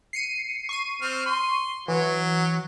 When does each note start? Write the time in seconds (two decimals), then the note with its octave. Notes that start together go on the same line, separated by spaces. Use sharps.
0.13 C7 C#7 D#7
0.69 C#6 C7 D#7
1.02 C4 F6
1.26 C6
1.88 E3 F#3